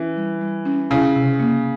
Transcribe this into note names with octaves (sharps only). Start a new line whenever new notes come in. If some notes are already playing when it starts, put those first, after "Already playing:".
Already playing: E3 C#4
G3
G3
C#4
C#3 E4
C3
A#3